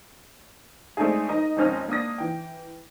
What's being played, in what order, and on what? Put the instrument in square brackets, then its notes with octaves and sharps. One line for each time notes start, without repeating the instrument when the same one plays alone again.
[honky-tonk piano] G#3 A3 C4 D4 D#4 G#4
D#4 A#4 D#5 A#5
G#1 F2 C4 C#4 D#5 F6
A#3 D4 D#6 A#6
E3 G5